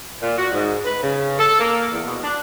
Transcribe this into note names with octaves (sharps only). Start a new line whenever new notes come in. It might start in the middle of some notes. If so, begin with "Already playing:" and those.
A#2
F#4
G#2
B4
C#3
A4
A#3
E2
B2
D4